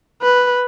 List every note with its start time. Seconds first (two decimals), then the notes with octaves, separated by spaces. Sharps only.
0.22 B4